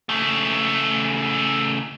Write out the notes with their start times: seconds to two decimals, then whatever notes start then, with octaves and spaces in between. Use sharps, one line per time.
0.09 C#3 A3